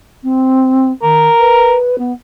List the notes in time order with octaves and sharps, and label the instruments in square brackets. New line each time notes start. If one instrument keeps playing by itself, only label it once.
[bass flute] C4
[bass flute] D#3 [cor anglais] A#4
[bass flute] B4
B3